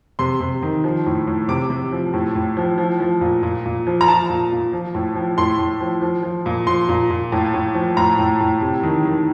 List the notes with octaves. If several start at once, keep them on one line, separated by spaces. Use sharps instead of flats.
C3 C6
C3
D#3
F3
A2
A2
C3 D6
C3
F3
A2
A2
F3
F3
F3
A#2
A#2
A#2
F3
A#5
F3 A5
A#2
A#2
F3
A2
F3
A2 C6
A2
F3
F3
F3
A#2
F3 C6
A#2
A#2
A2
A2
F3
A2 A#5
A2
A2
C3
D#3
D#3